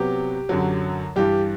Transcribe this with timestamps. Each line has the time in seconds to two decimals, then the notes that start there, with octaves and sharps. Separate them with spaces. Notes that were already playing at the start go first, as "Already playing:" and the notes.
Already playing: C3 F#3 B3 G4
0.49 F#2 D3 F#3
1.16 G2 E3 G3 G4